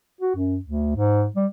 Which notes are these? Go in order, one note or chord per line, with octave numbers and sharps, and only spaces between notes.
F#4
F#2
D2
G#2
G3